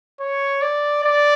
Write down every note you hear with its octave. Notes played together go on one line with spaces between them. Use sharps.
C#5
D5
D5